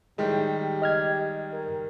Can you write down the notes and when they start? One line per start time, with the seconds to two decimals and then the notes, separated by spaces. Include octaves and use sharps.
0.18 A2 D#3 G3 G#3
0.52 G4
0.82 D#5 F6 G#6
1.53 A#4